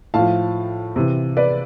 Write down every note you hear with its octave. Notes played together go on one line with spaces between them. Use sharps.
A2 F3 F5 A5
C3 E3
B4 D5